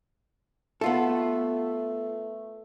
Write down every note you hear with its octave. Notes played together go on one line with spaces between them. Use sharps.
A3 B3 F4 A4